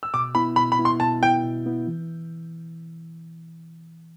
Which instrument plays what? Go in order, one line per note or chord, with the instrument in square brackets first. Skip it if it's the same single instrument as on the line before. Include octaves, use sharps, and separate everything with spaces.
[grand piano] E6
[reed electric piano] B2 [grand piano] D6
[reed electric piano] B3 E4 [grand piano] B5
[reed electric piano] B2 [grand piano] B5
[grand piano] B5
[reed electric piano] B3 E4
[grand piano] C6
[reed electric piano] B2 [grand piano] A5
[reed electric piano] B3 E4 [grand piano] G5
[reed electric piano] B2
B3 E4
E3